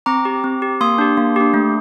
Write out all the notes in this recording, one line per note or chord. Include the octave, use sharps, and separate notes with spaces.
C4 A#5 D6
G4
C4
G4
A#3 C6 D#6
D4 G4
A#3
D4 G4
A3